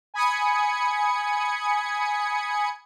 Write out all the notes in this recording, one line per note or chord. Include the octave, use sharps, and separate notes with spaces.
G#5 B5 D#6 G#6 C#7